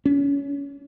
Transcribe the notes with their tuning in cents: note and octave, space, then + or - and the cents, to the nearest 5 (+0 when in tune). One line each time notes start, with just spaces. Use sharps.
C#4 +25